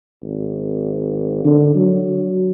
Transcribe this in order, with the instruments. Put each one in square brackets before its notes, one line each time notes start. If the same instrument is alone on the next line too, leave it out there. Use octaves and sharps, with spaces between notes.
[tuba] G#1
D3
F#3